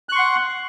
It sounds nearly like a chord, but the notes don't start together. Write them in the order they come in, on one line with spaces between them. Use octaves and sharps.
F#6 C#6 C6 F#5